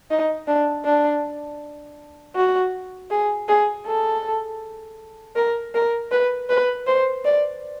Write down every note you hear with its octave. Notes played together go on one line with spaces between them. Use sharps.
D#4
D4
D4
F#4
G#4
G#4
A4
A#4
A#4
B4
B4
C5
D5